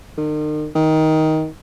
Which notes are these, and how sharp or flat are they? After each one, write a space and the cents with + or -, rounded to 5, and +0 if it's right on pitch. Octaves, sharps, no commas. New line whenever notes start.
D#3 -40
D#3 +15